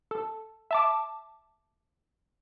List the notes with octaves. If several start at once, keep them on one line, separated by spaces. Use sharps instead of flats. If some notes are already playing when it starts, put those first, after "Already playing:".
A4
E5 A5 D6